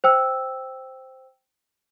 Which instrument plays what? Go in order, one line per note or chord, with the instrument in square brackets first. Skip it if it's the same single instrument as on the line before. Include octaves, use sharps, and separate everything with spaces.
[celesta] C5 G5 E6